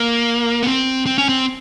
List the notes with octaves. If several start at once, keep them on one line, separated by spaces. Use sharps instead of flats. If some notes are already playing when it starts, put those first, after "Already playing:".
Already playing: A#3
B3
C4
C4
C#4
C4